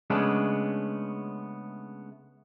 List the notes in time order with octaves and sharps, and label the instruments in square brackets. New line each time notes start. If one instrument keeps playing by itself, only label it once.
[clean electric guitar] C#3 G#3 A3 B3 C#4 D4